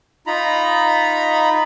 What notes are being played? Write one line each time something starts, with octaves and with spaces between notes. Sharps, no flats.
D#4 F4 A#5 B5